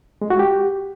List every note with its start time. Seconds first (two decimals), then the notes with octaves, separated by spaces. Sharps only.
0.22 G#3
0.30 F#4
0.39 G4